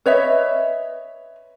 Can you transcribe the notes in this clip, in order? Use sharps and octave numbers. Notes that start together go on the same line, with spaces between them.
B4 C#5 D#5 E5